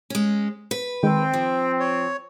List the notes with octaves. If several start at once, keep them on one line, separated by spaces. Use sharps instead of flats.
G#3 C#4
B4
D#3 G#3 C4 G5
F3
C#5